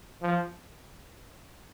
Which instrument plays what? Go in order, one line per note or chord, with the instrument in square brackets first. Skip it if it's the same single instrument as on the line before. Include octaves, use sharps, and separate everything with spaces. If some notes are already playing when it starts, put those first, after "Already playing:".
[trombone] F3